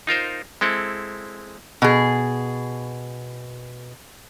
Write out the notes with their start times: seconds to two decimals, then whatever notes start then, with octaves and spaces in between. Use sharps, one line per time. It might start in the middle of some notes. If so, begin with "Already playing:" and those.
0.07 D#4 F4 A#4 C5
0.61 G#3 C4 E4 A4
1.82 B2 G#4